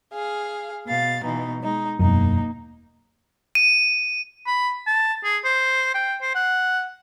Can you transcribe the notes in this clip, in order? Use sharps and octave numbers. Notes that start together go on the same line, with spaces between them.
G#4 F5
B2 F5 A6
B2 E3 D#4
G#3 D#4
E1 F#2 A#3 D#4
D#7
B5
A5
G#4
C5
G5
C5
F#5